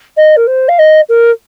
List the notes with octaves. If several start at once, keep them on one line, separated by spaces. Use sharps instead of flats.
D#5
A#4
C5
F5
D#5
A#4